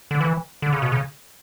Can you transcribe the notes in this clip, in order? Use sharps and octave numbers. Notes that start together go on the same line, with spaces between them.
D3
E3
D3
C#3
B2
C#3